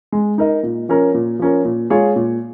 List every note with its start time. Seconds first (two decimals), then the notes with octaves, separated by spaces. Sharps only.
0.12 G#3
0.38 D#4 A#4 D#5
0.63 A#2
0.89 F3 C#4 A#4
1.14 A#2
1.39 F3 C#4 A#4
1.65 A#2
1.90 G#3 F4 G#4 C#5
2.16 A#2